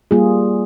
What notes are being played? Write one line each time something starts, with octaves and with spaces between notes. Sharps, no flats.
G3 A#3 F4 G#4